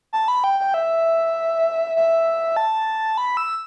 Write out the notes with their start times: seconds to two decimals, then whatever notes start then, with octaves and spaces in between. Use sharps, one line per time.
0.13 A5
0.28 B5
0.44 G5
0.60 G5
0.74 E5
1.96 E5
2.57 A5
3.18 B5
3.37 E6